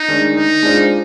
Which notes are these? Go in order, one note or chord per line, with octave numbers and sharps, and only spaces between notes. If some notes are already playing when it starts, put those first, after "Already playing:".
Already playing: D#4
D#3 G#3 D4
D#3 D#4
G#3 D4 F4 C5